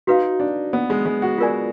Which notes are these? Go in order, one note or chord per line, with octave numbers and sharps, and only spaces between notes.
D#4 F#4 B4 F5
D4
B3
G#3
G#3
F#4
F4 A#4 D5 G#5